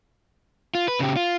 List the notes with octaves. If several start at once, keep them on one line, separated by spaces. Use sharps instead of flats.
F4
B4
C#3 G4
F4